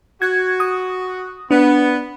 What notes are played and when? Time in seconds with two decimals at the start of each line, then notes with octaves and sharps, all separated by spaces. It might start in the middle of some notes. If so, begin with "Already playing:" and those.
0.22 F#4 G#6
0.60 D#6
1.51 B3 D4